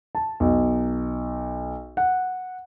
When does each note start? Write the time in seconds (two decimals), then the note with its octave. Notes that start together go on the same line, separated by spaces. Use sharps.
0.15 A5
0.40 B1
1.97 F#5